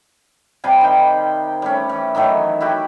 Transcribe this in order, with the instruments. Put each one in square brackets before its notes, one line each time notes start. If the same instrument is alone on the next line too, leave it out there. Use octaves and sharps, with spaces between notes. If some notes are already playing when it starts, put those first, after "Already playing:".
[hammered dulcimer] C3 G3 G#5
D#3 G5
G3 A3 C#4
E3
D#3 E3 F#3 A3
E4 F#4 G4